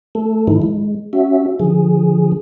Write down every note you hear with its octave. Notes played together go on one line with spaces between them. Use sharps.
A3 A4
G#2 D#3 E3 D#4 E4
G#3
C#4 F#4 E5
D3 F3 G#4